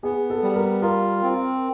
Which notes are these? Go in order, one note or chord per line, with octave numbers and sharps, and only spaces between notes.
B3 G#4
A4
G3
A#4
F4 A#4
C4